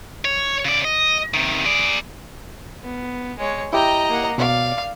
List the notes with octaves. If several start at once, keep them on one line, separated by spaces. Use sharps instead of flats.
C#5
C#3 D5
D#5
C3 D#3
G#4 D5
B3
G#3 C#5
E4 G4 D#5 G5 A#5
A#3 F#5
B2 D5 F5